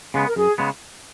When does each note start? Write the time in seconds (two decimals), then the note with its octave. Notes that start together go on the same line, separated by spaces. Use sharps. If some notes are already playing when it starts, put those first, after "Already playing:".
0.14 C#3 G#3 B3
0.26 A#4
0.36 F#2 G#4
0.58 C#3 G#3 B3